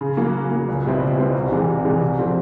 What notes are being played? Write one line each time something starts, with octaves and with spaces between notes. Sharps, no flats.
C#3
F#3 A#3
C#3
F#3 A#3
C#2
B2 G3 C4 E4
C#2
B2 G3 C4 E4
C2
C3 E3 G#3
C2
C3 E3 G#3
C2
C3 F3 A3 C4